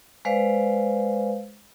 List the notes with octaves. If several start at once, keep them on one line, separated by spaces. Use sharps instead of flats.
G#3 B4 C5 D5 F5